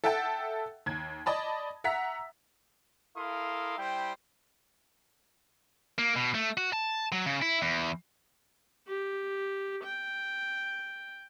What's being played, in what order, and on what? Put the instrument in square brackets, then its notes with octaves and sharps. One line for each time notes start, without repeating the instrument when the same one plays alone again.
[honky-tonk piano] A4 E5 F#5 G5 A5
D#2 G#6
D5 D#5 A5 B5
E5 F#5 A#5 E6 B6
[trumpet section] E4 A4 A#4 F5 C6 D#6
G3 E4 C5 G5
[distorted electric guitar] A#3
B2
A3
F#4
A5
F#3
C#3
E4
E2
[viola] G4
G5